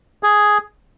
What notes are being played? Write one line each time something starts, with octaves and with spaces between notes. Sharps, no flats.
G#4